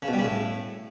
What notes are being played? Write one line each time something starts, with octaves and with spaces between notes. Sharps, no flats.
C#3
B2
G3
C#3
A2